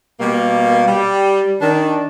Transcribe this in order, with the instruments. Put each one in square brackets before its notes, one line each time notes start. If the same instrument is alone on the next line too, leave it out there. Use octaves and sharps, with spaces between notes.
[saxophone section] B2 G3 A#3
G3
D#3 D4